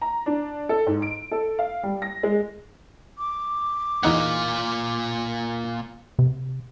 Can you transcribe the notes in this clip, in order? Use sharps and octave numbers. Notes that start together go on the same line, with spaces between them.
A#5
D4
A4
G#2
D7
A4
F5
G3
A#6
G#3
D6
E2 A#2 D#4 F4 F#5
C3